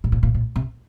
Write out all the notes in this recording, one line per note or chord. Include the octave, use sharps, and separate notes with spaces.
A2
A#2
A#2
A2
C3